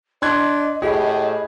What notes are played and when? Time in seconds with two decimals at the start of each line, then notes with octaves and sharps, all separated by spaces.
0.22 D4 D#5 C6 F#6 G#6
0.82 A2 G4 G#4